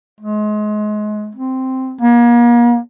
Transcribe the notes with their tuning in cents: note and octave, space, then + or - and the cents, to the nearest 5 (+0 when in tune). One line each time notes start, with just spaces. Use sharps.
G#3 +30
C4 -5
A#3 +35